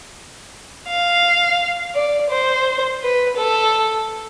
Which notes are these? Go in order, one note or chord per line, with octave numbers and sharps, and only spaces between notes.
F5
D5
C5
B4
A4